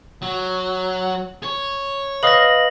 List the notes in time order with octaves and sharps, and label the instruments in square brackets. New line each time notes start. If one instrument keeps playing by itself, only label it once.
[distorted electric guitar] F#3
C#5
[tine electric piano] B4 D#5 F5 [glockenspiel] A#6 F#7